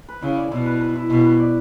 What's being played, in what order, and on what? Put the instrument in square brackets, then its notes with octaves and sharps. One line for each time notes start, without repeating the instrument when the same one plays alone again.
[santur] B4
[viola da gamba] C#3 [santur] E4
[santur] D5
[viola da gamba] B2 [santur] E4
[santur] B4
B4
E4
[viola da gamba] B2 [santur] E4
[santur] B4
D5